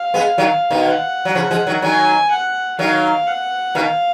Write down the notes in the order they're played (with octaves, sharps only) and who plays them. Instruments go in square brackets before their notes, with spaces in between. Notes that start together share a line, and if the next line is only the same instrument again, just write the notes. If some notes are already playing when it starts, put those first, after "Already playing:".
Already playing: [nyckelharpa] F5
[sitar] G#3 B3
D#3 F#3
B2 D#3
[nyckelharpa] F#5
[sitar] F#3
C#3 F3
F3 G#3
D#3 F#3
[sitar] D#3 F#3 [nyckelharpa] G#5
[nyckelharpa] F#5
[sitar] D#3 F#3 [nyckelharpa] F5
[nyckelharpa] F#5
[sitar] B2 D#3 [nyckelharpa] F5